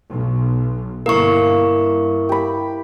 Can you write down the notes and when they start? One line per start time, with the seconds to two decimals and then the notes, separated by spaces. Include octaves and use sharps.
0.10 B1
1.06 G1 A#3 E4 A#4 E5 C#6
1.49 G2
2.29 G4 B5